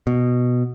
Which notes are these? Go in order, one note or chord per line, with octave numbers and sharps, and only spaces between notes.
B2